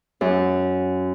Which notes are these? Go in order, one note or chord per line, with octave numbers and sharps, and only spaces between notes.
F#2